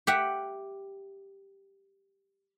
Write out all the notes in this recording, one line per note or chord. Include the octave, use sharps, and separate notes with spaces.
G4 E5 F#5